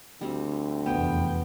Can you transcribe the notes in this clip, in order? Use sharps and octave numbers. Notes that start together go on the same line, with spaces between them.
D2 G3 C4
F1 E2 B3 G5